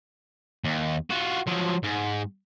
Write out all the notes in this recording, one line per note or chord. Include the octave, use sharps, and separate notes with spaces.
D#2
F4 F#4
F3 F#3
G#2